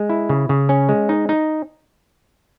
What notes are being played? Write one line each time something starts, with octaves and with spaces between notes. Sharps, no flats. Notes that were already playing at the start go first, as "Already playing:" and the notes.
Already playing: G#3
E4
C#3
C#3
C#4
G#3
D#4
D#4